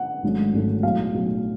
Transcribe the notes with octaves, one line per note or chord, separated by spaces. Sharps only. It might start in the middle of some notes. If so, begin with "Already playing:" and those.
Already playing: F#5
G#1 G#2 F#3 A3 C#4
G#1 G#2 F#3 A3 C#4
B1 A2 F#3 F5
B1 A2 F#3